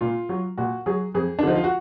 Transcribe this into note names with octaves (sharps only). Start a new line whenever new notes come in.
A#2 F4
F#3
A#2 F#4
F#3 G#4
F2 G#4
D4
D3 F3 D#4
F4
F#4